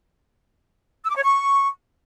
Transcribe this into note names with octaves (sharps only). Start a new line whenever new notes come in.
E6
D6
C#5
C#6